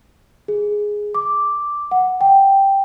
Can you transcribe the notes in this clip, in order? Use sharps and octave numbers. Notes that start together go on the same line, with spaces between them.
G#4
D6
F#5
G5